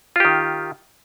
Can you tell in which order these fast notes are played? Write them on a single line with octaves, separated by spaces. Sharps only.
F4 G4 D#3